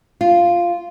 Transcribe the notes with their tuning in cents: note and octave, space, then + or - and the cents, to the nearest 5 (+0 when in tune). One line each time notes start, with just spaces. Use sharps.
F4 -5